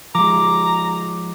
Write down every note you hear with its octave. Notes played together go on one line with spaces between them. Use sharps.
F3 G#3 A#5 D6